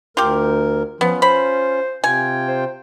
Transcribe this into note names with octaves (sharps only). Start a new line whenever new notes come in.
D2 F4 G4 A#4
F3 B3 C#4 F4
C5 B5
C3 F4 G5 G#5
C5